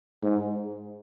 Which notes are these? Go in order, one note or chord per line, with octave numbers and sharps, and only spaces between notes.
G#2